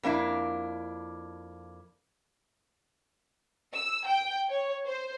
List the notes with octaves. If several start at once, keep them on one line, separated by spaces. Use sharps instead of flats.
F2 A#3 D4 E4
E6
G5
C#5
C5